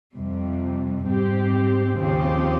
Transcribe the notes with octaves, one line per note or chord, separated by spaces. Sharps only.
F2 C3 G3
G#2 G3 C4 G4
D#2 C#3 F3 C4 G4